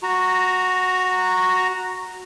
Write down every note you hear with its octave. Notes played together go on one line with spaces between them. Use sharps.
F#4 A#5